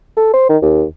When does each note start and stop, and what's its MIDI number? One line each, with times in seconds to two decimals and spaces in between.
0.17 0.31 69
0.34 0.47 72
0.49 0.57 51
0.62 0.84 39